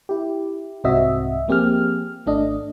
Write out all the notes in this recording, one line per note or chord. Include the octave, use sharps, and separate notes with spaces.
E4 G4
C2 G#2 C4 F#4 D#5 E5
F3 A#3 C4 G4 G#4 F6
G#1 A3 D4 D#5